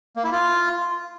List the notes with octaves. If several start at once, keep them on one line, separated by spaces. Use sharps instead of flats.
A#3
E4
F4